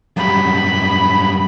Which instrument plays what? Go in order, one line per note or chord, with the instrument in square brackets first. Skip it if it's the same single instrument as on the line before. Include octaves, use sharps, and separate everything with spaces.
[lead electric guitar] F#2 G3 [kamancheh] B5